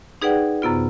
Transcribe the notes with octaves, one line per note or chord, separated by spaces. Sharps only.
D#4 G#4 B4 D5 F#5 G5
F#2 C3 B3 F4